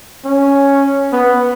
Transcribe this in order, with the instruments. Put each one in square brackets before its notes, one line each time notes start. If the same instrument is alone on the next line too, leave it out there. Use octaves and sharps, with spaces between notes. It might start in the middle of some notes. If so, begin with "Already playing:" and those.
[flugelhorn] C#4
B3